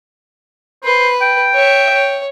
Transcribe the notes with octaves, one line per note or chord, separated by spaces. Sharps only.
B4 C5
G5
C#5 E5
C#5